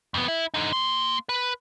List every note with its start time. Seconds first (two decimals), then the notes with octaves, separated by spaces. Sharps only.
0.14 F2 B3
0.28 E4
0.54 D3 D#4
0.73 A#3 C6
1.29 B4